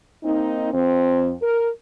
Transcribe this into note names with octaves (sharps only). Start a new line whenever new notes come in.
A#3 C4 D#4
F2 C4
A#4